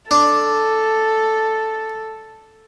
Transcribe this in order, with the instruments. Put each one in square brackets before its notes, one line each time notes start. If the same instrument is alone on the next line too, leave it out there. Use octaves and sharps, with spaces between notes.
[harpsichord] D4 [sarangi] A4